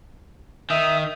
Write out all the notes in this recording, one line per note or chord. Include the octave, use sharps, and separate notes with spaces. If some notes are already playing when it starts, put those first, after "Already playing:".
D#3 E5 D#6